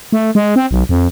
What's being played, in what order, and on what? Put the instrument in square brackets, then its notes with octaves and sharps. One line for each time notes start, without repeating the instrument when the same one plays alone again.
[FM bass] A3
G#3
C4
B1
F2